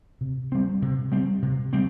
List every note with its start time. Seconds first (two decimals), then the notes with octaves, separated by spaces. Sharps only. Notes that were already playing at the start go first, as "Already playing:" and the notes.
0.21 C3
0.52 G3 C4
0.82 C3
1.12 G3 C4
1.42 C3
1.73 G3 C4